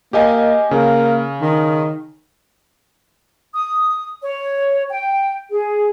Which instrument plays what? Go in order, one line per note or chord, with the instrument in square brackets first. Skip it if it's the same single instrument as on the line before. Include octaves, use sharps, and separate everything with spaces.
[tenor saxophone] A#3 [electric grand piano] G4 D#5 G#5
[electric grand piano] C#3 [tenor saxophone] A#3
[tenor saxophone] D#3
[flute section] D#6
C#5
G5
G#4